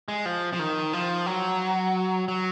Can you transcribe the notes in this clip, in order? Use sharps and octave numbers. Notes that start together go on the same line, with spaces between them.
G#3
F3
F3
D#3
F3
F#3
F#3